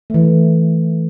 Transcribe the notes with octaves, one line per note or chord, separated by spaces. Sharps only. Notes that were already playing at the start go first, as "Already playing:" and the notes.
E3 A3